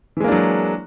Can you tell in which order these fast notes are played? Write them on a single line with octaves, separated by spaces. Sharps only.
E3 G#3 A#3 D4 F#3